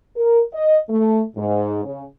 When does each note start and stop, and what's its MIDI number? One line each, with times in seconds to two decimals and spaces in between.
0.16 0.41 70
0.53 0.79 75
0.90 1.23 57
1.37 1.82 44
1.85 2.04 49